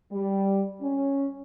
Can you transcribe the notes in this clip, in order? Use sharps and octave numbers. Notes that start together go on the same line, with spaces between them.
G3
C#4